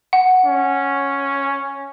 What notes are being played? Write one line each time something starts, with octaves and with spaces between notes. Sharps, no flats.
F#5
C#4